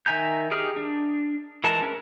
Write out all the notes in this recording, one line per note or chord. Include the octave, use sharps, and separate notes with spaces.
D#3 E5 G#5 A#5 G6
D#4 G4 G#4 F6
D4
E3 G#3 A#4 A5
C#4 A#4 B4